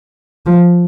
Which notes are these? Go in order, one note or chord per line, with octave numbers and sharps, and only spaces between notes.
F3